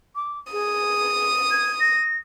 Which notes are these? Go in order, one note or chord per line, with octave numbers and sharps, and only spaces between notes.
D6
G#4 D#6
G#6
A#6